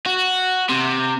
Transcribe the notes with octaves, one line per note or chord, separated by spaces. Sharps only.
F#4
C3